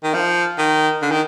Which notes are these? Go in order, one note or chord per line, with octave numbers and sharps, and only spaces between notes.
D#3
F3
D#3
D3
D#3